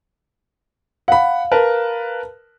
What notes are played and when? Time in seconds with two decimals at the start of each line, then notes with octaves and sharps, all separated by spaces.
1.08 F5 F#5 B5
1.51 A#4 B4 A5